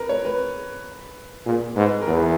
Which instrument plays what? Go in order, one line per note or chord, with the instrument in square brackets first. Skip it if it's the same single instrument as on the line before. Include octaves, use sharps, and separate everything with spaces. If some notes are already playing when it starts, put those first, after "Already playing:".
Already playing: [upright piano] A#4 B4
C#5
B4
[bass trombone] A#2 [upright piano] G#4
[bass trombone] G#2 [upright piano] B4
[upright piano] A#4
[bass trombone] E2 [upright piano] B4